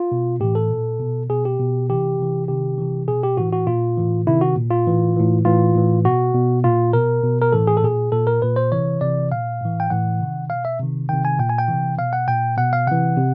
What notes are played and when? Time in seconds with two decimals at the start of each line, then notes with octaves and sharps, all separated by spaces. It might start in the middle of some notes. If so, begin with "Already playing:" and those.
Already playing: F4
0.12 B2
0.40 A2 E3 G4
0.55 A4
0.71 A#2
1.00 B2
1.30 B2 G#4
1.45 G4
1.60 B2
1.90 C3 E3 G4
2.19 C3 E3
2.48 C3 D#3 G4
2.78 C3 E3
3.08 B2 G#4
3.23 G4
3.37 A2 E3 F#4
3.52 F#4
3.67 A#2 F4
3.97 A2 E3
4.26 C3 D#3 E4
4.41 F#4
4.56 A#2
4.71 F4
4.87 A2 E3
5.16 A2 E3
5.45 A2 E3 F4
5.75 A2 E3
6.05 B2 F#4
6.34 B2
6.64 A#2 F4
6.93 B2 A#4
7.23 B2
7.42 A#4
7.52 A2 E3 A4
7.67 G#4
7.77 A4
7.83 A#2 G#4
8.12 A#2 A4
8.27 A#4
8.42 A#2 B4
8.56 C5
8.72 C3 E3 C#5
9.01 C3 E3 D5
9.32 A#2 F5
9.61 A2 E3
9.80 G5
9.90 A2 E3 F#5
10.20 C3 D#3
10.49 B2 F5
10.65 E5
10.79 C3 D#3
11.09 C3 D#3 G5
11.25 G#5
11.39 A#2 G5
11.49 G#5
11.58 G5
11.68 C3 E3
11.98 B2 F5
12.13 F#5
12.28 A#2 G5
12.57 B2 F#5
12.73 F5
12.87 C3 E3 F#5
13.17 C3